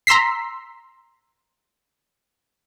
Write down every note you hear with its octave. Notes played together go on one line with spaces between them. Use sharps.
A#5 C6 E6 B6 C7